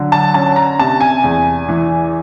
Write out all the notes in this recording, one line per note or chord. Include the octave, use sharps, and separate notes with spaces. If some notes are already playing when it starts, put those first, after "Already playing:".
Already playing: D3 F#3
A5
C#4 A5
A#5
C3 A5
G#5
E2
E3